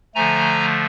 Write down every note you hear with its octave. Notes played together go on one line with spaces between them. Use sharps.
D3 F3 A3 G#5 A#5